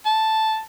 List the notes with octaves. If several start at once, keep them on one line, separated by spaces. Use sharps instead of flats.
A5